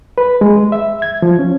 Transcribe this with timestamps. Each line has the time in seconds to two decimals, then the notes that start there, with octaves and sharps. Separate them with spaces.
0.18 B4
0.41 G#3
0.72 E5
1.02 G#6
1.22 F3
1.39 C#4